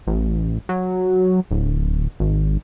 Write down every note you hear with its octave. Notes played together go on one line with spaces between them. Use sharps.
A1
F#3
D1
G#1